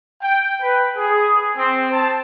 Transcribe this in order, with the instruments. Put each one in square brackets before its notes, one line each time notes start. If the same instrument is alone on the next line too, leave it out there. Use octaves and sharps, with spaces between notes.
[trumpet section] G5
B4
G#4
C4
A5